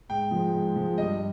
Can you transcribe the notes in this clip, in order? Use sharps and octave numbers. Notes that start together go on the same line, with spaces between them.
G#2 G5
F3 G#3
G#2
F3 G#3
G2 D#5